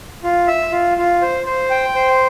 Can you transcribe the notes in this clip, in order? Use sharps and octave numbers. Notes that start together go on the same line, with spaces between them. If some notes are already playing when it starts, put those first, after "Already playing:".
F4
E5
F4
F4
C5
C5
G5
C5